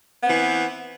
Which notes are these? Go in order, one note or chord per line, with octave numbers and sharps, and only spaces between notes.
E3 B3 C4